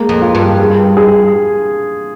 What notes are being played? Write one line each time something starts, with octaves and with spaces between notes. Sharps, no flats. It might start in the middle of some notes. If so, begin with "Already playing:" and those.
Already playing: G#3 A#3
F2
F4
G2
G#4
G#4